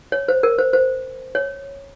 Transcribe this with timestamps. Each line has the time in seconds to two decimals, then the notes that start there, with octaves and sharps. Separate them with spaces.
0.12 C#5
0.28 C5
0.43 A#4
0.59 C5
0.73 C5
1.35 C#5